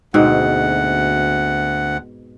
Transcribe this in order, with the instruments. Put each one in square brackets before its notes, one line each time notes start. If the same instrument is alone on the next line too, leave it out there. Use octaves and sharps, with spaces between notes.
[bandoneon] D2 F#5 [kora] G#2 B2 C4